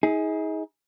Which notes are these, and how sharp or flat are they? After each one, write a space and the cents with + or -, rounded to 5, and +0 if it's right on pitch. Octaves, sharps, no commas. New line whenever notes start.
D#4 +40 G#4 +0